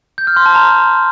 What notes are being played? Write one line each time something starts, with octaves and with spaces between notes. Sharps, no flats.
G6
F6
C6
A5
A#5